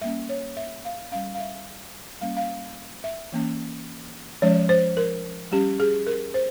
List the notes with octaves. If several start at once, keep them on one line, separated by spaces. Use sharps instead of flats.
G3 A#3 C#4 E5
C#5
E5
F5
G3 C#4 F5
F5
E5
G3 A#3 C#4 F5
F5
E5
E3 A#3 C#4
F3 G#3 C#4 C#5
C5
A#4
G3 C#4 G4
G#4
A#4
C5